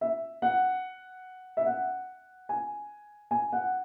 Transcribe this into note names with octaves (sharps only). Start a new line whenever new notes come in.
E5
F#5
E5
F#5
G#5
G#5
F#5